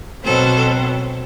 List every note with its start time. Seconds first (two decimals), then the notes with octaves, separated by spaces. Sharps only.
0.24 B2 F#3 C4 A4